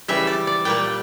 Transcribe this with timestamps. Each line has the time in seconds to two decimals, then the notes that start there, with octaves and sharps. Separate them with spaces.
0.08 C#3 E3 G3 E5
0.27 D5
0.47 D5
0.65 A#2 G3 A#3 G5